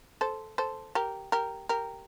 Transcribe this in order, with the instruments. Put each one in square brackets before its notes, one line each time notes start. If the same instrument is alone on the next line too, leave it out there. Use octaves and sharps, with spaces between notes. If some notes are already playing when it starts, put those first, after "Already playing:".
[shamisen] A4 C5
A4 C5
G4 A#4
G4 A#4
G4 A#4